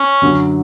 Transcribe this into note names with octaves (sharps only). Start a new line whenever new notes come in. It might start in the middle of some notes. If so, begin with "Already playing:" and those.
Already playing: C#4
F#2 D3 F#3